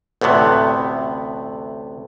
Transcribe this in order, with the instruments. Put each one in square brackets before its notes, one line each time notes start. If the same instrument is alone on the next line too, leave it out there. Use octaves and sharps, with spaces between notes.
[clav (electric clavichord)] A1 D2 A2 C3 B3